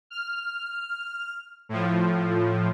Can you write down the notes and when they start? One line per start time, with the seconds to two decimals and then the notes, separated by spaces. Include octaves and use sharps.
0.10 F6
1.69 A2 F3